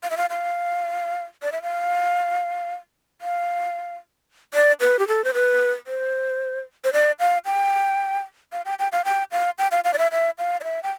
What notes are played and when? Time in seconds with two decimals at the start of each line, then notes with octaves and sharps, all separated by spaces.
0.03 F5
0.10 E5
0.17 F5
0.30 F5
1.42 D5
1.52 E5
1.62 F5
3.21 F5
4.54 D5
4.81 B4
4.99 G4
5.08 A4
5.24 C5
5.34 B4
5.87 C5
6.84 C5
6.93 D5
7.20 F5
7.45 G5
8.52 F5
8.65 G5
8.79 G5
8.92 F5
9.05 G5
9.32 F5
9.58 G5
9.71 F5
9.84 F5
9.94 D5
9.98 E5
10.12 E5
10.38 F5
10.61 D5
10.64 E5
10.83 G5